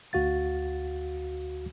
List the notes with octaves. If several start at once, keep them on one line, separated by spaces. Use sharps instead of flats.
D2 F#4 F5 A6